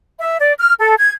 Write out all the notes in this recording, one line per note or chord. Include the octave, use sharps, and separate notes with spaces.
E5
D5
F6
A4
G#6